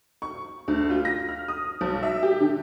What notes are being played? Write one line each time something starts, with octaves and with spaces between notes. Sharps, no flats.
C#6
D2
F4
A#6
F6
D#6
B1
E5
G4
D3